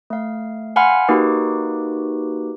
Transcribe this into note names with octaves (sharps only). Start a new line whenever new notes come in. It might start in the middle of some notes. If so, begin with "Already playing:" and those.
A3 F5
F5 F#5 G#5 B5 C6 F6
A#3 D#4 F#4 G4 B4 D6